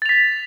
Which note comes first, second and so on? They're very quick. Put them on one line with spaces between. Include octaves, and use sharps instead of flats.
A6 F7 B6